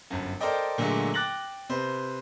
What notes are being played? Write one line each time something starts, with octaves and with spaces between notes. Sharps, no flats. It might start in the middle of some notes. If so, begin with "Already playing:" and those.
G1 F#2
A4 A#4 C5 D5 D#5 G5
A#2 D3 F#3 G#3 A3
G5 D6 F#6 A6 A#6 F#7
C3 B4 C5